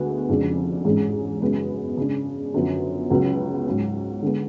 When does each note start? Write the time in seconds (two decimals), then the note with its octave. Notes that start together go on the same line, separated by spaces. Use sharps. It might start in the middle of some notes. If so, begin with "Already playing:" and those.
Already playing: D2 D3 G#3 B3
0.29 F1 F2 C#3 G#3 D4
0.84 A1 G#2 G#3 C#4 G#4
1.41 F#2 C#3 G#3 B3
1.97 C#3 G#3 D4
2.54 F#2 D3 F3 B3
3.10 C#2 C#3 F#3 B3
3.66 G#2 F#3 C#4
4.22 D3 G#3 B3